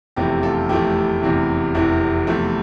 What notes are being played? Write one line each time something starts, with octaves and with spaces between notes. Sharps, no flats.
F1 E2 C3 F3 A3 E4 G4
F4 A4
F1 E2 C3 F3 A3 E4 G4
F1 E2 C3 E3
F1 E2 C3 E3 E4
E2 C3 F3 A3